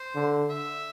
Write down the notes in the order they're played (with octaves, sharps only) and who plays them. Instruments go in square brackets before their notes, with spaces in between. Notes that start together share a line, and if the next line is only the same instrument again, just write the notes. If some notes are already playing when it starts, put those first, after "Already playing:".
Already playing: [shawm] C5
[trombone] D3
[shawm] E5